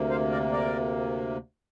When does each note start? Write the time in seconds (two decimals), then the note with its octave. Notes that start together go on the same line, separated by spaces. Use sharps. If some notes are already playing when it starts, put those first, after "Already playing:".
Already playing: D2 C3 A#3
0.10 C5 F5
0.31 A#4 D5
0.52 A#4 D5